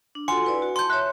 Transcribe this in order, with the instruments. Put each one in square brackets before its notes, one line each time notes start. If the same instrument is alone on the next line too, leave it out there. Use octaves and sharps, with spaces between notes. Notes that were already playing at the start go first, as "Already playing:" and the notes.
[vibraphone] D4
[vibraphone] F4 F#4 A4 [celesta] F#5 G#5 C6 [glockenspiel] C#7
[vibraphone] E4 B4 D5
F#4
[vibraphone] A5 [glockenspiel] C6 G6
[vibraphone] C#5 E5 [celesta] F#6